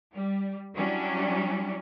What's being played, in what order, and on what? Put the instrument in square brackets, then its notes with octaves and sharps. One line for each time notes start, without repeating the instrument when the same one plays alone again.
[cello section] G3
F#3 G3 C#4 D4 E4